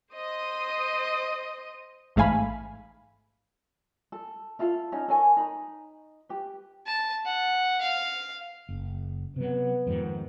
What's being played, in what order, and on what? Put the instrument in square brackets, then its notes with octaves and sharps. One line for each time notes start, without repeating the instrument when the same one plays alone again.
[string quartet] C5 D#5 D#6
[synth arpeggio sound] A1 G#2 A3 F5 G#5 B5
[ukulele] A4
E4 F4 A4 F5
C#4 D#4 F5
A4 A#4 C#5 G#5
D#4 A#5 B5
G4 B4
[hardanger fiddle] A5
F#5
F5
[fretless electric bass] F#1
[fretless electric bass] C3 F#3 [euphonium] B3
[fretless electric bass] F2 G#2 D#3